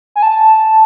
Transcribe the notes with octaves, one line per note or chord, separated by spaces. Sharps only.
G#5
A5